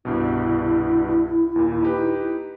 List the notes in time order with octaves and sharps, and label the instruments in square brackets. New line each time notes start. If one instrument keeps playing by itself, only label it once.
[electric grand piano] C2 G2 B2 [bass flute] E4
[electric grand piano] D#2 A#2
D#4 G4 B4